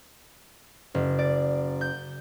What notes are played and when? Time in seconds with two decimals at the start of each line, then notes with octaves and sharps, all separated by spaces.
0.94 F#1
1.19 D5
1.81 G6